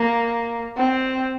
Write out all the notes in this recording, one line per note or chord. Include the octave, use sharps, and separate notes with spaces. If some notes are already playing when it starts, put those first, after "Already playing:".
Already playing: A#3
C4